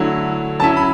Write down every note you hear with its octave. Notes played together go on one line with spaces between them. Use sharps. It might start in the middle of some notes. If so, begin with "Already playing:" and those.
Already playing: D3 F#3 A3 E4
F#3 C#4 E4 A5
B5